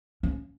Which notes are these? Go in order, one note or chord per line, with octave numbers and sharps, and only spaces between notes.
C#4